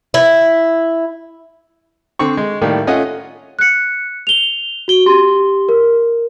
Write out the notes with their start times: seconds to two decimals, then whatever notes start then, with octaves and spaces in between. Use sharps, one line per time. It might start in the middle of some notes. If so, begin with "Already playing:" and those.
0.14 E4
2.19 D3 C4 C#6
2.37 G#3
2.61 A2 D#3 G3 A#3
2.87 A3 C#4 F4 D#5 F#5
3.59 F#6 C#7
4.27 F7 G7
4.88 F#4 G7
5.06 G4 C6
5.69 A#4